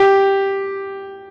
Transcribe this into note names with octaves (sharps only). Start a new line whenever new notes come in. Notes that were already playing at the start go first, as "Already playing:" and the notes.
Already playing: G4